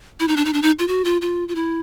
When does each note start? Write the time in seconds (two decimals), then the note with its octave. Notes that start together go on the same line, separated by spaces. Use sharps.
0.20 E4
0.28 D#4
0.36 D4
0.45 D#4
0.53 D4
0.62 D#4
0.79 F4
0.88 F#4
1.05 F4
1.21 F4
1.48 F4
1.55 E4